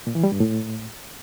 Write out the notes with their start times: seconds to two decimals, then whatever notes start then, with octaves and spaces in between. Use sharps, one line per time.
0.07 A#2
0.15 E3
0.23 G3
0.32 G2
0.40 A2